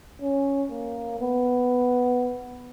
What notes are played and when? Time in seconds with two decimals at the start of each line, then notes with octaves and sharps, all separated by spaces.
0.22 C#4
0.71 A#3
1.20 B3